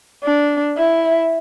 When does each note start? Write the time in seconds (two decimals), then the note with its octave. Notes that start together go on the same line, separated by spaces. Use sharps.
0.24 D4
0.78 E4